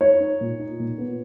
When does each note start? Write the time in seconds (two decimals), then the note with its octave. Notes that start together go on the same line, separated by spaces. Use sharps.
0.01 D#4 C#5
0.20 D#4
0.41 A#2
0.60 D#4
0.79 A#2
0.98 B3